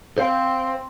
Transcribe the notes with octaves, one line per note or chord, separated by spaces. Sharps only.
C4 C5 F5